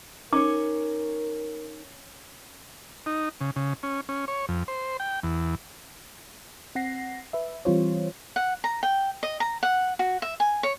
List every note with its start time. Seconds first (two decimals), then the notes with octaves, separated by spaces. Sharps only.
0.33 C#4 D#4 A#4 C#5 D6
3.06 D#4
3.41 C#3
3.56 C#3
3.83 C#4
4.09 C#4
4.28 C#5
4.49 F2
4.68 C5
5.00 G5
5.23 E2
6.75 C4 F#5 A#6 C7
7.33 B4 E5
7.65 E3 G3 C4 F4 C5 C#5
8.36 F#5
8.64 A#5
8.83 G5
9.23 D#5
9.40 A#5
9.63 F#5
9.99 F#4
10.22 E5
10.40 G#5
10.63 C#5